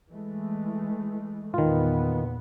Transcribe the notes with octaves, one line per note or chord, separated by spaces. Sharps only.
E3 G#3 A3
E2 A#2 D#3 B3 F4